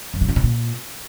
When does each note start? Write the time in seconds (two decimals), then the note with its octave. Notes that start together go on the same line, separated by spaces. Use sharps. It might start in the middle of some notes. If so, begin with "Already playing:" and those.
0.14 F#2
0.21 C#3
0.29 G2
0.36 A2
0.44 A#2